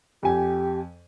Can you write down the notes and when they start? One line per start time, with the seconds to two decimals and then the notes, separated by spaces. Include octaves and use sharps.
0.23 F2 G4 G#5